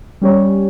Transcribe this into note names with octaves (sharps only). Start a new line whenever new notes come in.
G3 C#4 G4 C#5